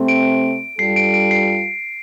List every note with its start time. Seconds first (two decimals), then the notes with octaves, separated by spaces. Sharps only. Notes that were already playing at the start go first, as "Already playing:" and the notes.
Already playing: C3 A3 C4
0.08 D7
0.78 G2 G3 F4 A4 C7
0.96 D7
1.14 D7
1.31 C7